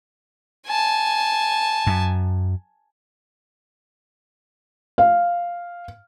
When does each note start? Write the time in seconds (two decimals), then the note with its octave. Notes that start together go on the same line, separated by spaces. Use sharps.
0.66 G#5 A5
1.87 F#2
4.98 F5